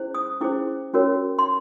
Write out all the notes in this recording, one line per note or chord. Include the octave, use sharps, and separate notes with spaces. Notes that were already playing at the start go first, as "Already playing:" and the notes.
Already playing: C#4 E4 G#4 C5
D#6
C#4 E4 G#4 C5 D6
C#4 F#4 A#4 C#5
C6